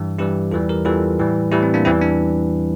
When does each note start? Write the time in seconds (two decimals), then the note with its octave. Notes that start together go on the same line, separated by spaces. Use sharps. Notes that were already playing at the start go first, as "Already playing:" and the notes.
Already playing: G2 E3 G3
0.19 G2 E3 G3 E4 G4
0.52 E2 E3 G3 F4 A4
0.69 G4 A#4
0.85 E2 E3 G3 F4 A4
1.19 A2 E3 G3
1.52 A2 E3 G3 E4 G4
1.63 C4
1.74 A#3 D4
1.85 E2 E3 G3 C4 E4
2.02 D4